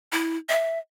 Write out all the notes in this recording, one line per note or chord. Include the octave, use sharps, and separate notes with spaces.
E4
E5